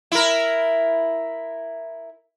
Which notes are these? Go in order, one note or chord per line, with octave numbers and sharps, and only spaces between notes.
E4 A#4